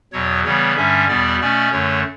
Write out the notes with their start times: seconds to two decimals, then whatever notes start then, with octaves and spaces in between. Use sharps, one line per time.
0.13 E2 B2 F#3 C#5
0.44 C#3 E3 G3 B3 C#5
0.76 G2 D3 G3 C#4 E5
1.08 E2 B2 G3 B3 D5
1.40 B2 A3 C#4 D5
1.71 F#2 D3 A3 C#5